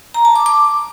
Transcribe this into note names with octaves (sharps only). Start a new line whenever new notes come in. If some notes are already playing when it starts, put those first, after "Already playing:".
A#5
A5
D6
D6